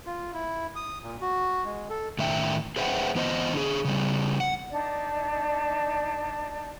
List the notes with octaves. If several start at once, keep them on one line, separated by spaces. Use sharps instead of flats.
F4
E4
D#6
A#2
F#4
G#3
A4
A2 D#3 E5 F#5 G5
G#4 B4 C5 E5 F#5 G5
E3 B3 C5 D#5
D3 G#4
C#3 G3
F#5
D4 D#4 D5